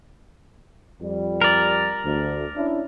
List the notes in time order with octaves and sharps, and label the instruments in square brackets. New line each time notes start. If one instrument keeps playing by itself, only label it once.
[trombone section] F2 G3
[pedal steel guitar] A#4 D5
[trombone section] D2
C#4 D4 E4